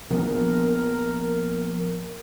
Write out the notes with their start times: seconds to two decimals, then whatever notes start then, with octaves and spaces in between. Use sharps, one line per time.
0.10 A#1 F3 B3 A#4